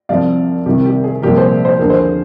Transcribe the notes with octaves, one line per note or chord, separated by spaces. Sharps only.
C2 C3 F3 D5 F5
C2 C3 D#3 G4
G4
G#4
C2 A#2 F3 G4 A#4
G#4 C5
C5
D#2 D3 F3 A#4
G#4 C5